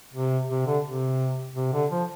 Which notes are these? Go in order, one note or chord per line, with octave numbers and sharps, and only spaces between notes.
C3
C3
D3
C3
C3
D3
F3